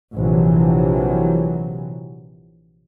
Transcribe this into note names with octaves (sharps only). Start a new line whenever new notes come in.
A#1 C3 E3 F#3